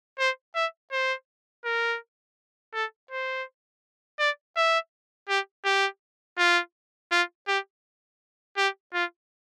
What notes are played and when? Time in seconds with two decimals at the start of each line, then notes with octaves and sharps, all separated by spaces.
0.19 C5
0.55 E5
0.92 C5
1.65 A#4
2.74 A4
3.11 C5
4.19 D5
4.57 E5
5.29 G4
5.65 G4
6.38 F4
7.11 F4
7.48 G4
8.57 G4
8.94 F4